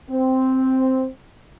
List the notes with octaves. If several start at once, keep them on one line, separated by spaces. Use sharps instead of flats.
C4